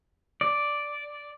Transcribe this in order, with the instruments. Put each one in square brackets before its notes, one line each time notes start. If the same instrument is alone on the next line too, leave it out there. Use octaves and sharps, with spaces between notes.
[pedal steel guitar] D5